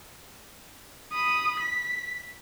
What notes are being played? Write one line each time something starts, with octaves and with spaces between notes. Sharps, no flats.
B5 D#6
B6